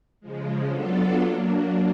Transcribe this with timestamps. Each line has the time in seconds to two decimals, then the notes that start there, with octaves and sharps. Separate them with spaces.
0.20 C#3 F3 G#3
0.70 F#3 B3 D4 F4 A4
1.19 F#3 A#3 D4